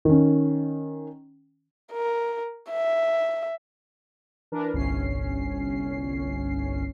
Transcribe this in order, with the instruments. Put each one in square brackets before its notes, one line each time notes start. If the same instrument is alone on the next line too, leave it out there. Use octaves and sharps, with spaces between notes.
[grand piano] D#3 C#4
[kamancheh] A#4
E5
[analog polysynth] E3 D4 A#4 B4
G1 C2 C#4 C7